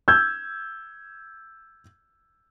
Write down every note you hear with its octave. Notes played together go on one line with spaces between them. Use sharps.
E6 G6 G#6